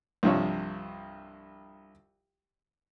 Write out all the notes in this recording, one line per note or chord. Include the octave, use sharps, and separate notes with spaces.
C2 G2 C3 F3 C#5